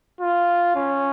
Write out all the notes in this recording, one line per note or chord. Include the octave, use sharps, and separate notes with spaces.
F4
C#4